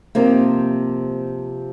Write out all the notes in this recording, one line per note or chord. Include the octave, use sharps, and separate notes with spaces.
C3 F3 A#3 D#4